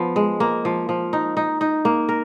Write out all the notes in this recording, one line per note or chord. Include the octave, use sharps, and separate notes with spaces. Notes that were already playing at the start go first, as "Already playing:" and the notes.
Already playing: F3 B3
G#3
A#3
F3
F3
D#4
D#4
D#4
A#3
A#4